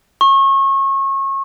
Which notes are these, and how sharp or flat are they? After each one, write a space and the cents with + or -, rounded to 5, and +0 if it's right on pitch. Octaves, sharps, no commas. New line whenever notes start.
C#6 -30